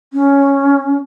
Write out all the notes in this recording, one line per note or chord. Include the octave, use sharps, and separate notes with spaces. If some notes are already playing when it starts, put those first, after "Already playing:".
C#4